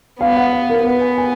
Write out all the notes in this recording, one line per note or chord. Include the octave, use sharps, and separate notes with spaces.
B3 F5
F#5
F5
A#4
B3 B4
G#5
G#5